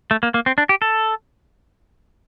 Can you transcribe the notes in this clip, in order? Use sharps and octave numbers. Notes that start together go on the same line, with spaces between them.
A3
A#3
A#3
C4
D4
G4
A4